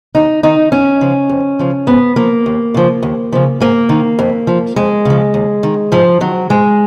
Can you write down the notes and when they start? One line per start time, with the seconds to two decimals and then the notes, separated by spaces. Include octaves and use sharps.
0.15 D#2 D#4
0.43 D#3 D#4
0.72 F#2 C#4
1.01 C#3 F3
1.29 F2
1.59 C#3 F3
1.87 G#2 B3
2.16 F3 A#3
2.46 D#2
2.74 C#3 F3
3.03 D#2
3.33 C#3 F3
3.60 G#2 A#3
3.89 D#3
4.19 F2
4.47 F3
4.76 F2 G#3
5.05 C#3 F3
5.34 D#2
5.63 D#3
5.92 G#2 F3
6.21 D#3 F#3
6.50 G#2 G#3